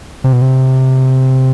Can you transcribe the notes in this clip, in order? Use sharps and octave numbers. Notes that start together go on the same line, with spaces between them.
C3
B2
C3